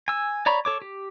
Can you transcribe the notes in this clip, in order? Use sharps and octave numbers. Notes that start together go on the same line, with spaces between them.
G#5 E6
C#5 D5 A#5 B5 C#6
A4 C#5 D6
G4